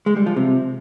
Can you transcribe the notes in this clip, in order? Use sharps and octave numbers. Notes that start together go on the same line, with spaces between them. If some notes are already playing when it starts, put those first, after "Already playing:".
G#3
G3
F3
C3